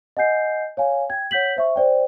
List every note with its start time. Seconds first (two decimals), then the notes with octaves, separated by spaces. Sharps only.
0.17 D#5 F#5 G#5 G6 C7
0.77 C#5 F5 G#5
1.09 G5 G#6
1.31 C#5 F#5 G6 B6 F#7
1.56 C5 E5 C#6
1.76 C5 D5 G5